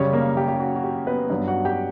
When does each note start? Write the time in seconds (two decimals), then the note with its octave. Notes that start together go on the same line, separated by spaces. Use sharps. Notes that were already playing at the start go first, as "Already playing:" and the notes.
Already playing: F#2 C#3 G3 C#4 C#5
0.13 A#3 A#4
0.37 G4
0.48 G4
0.60 F#4
0.76 F#4
0.84 G4
1.06 B3 B4
1.30 G2 F#3 B3
1.48 F#4 F#5
1.65 G4 G5